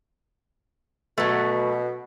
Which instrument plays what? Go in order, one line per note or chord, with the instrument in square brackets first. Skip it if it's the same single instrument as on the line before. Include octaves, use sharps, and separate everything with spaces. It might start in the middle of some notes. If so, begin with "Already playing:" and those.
[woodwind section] B2 [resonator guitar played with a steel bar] F#3 A3